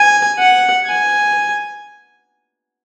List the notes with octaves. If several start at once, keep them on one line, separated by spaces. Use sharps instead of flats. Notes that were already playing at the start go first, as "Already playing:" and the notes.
Already playing: G#5
F#5
G#5